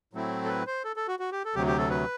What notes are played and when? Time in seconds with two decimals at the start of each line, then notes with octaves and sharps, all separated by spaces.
0.13 A2 F#3 A3 C4 E4
0.45 A4
0.48 B4
0.67 C5
0.84 A4
0.96 A4
1.08 F#4
1.19 F#4
1.32 G4
1.45 A4
1.55 D2 C3 F#3 G4
1.67 G4
1.78 A4
1.90 B4